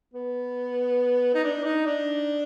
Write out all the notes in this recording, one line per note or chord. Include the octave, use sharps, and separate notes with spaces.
B3
D#4
D4
D#4
D4